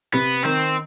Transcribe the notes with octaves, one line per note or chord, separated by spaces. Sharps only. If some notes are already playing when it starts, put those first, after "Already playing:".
C3 B3
D#3 C4